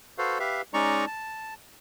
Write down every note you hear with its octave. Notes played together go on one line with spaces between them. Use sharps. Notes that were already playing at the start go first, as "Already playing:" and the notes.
F#4 A4 B4 C5 F5
G4 B4 E5 F5
G#3 C#4 D#4 D5 A#5 C#6
A5